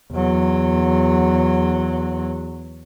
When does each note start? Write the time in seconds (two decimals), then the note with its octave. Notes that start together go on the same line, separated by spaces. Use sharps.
0.12 E2 F#3